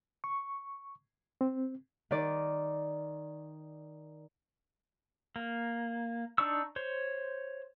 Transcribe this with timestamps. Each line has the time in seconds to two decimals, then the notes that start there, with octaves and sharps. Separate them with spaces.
0.24 C#6
1.41 C4
2.11 D#3 D5
5.36 A#3
6.38 D4 D#4 D5 C#6 E6
6.76 C5 C#5